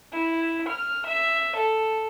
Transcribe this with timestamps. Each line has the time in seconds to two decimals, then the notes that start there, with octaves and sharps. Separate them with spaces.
0.11 E4
0.67 F6
1.06 E5
1.55 A4